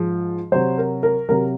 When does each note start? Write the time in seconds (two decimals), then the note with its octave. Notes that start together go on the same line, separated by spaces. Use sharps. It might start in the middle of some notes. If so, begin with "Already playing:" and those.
Already playing: G#2 F3 G#3
0.52 C3 F#3 C5
0.78 A#4
1.03 A#4
1.29 C3 F#3 A#4